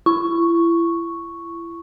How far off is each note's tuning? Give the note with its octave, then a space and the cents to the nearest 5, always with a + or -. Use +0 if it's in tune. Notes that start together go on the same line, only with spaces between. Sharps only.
E4 +35 C#6 +0